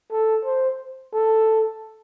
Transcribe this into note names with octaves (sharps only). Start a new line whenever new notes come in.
A4
C5
A4